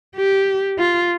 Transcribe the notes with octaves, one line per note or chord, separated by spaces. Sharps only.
G4
F4